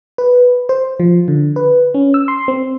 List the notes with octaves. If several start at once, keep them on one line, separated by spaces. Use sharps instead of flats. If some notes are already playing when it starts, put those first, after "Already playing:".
B4
C5
F3
D3
B4
C#4
E6
C6
C4